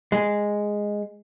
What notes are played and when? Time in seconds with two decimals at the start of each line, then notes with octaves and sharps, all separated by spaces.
0.12 G#3